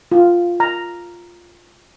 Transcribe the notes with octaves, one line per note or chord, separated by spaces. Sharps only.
F4
A#5